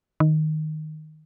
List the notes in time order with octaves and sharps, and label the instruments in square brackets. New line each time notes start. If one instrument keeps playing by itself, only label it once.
[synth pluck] D#3